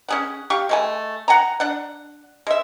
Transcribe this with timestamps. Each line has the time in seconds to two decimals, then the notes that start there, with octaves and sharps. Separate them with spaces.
0.09 C#4 G#4 F#5
0.50 G4 F5 C#6
0.69 G#3 A3 G#5
1.28 F#5 G#5 A#5
1.60 D4 F#5
2.47 G#3 E5